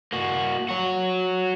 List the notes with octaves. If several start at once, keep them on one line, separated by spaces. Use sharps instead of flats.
A#3 F#4
F#4 C#5